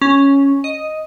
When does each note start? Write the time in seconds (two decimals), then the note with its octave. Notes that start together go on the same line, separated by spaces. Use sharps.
0.01 C#4
0.64 D#5